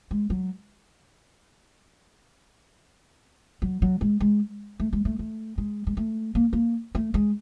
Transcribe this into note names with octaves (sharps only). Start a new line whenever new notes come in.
G#3
F#3
F#3
F#3
G#3
G#3
A3
G#3
A3
A3
G#3
G#3
A3
A#3
A#3
A3
G#3